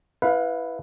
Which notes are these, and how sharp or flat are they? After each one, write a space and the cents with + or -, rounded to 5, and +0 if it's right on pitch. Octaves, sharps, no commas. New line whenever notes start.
E4 +0 B4 +0 F5 +30